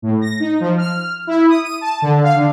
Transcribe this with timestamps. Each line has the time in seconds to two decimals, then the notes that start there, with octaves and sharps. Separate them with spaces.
0.02 A2
0.21 A#6
0.40 D#4
0.60 F3
0.78 F6
1.27 E4
1.48 D#6
1.63 D#7
1.81 A5
2.02 D3
2.23 F5
2.36 D3